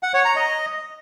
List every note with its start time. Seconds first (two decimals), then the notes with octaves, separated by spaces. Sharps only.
0.03 F#5
0.14 C#5
0.25 A#5
0.36 D#5